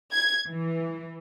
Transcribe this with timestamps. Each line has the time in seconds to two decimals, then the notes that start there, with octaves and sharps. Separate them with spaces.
0.12 G#6
0.47 E3